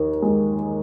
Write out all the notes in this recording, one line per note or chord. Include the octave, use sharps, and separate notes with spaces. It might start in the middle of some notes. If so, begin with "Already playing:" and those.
Already playing: D#2 D#3
G#3